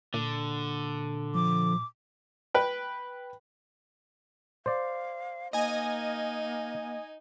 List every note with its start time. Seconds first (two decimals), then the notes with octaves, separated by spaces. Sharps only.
0.14 A#2 D3
1.35 F3 D6
2.54 B4 G5
4.66 C5 D5 F5
5.53 A#3 D#4 D#5 G#5